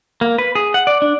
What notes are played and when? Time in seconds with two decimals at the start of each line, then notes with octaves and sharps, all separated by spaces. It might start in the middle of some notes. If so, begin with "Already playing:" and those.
0.21 A#3
0.38 B4
0.55 G#4
0.74 F#5
0.87 D5
1.02 D4